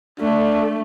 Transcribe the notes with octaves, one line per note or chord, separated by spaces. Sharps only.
A3 D4